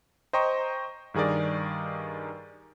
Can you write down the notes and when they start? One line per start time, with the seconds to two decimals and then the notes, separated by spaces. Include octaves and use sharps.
0.33 C5 D#5 G5 A#5 C#6
1.14 G2 D#3 G#4 A#4 D5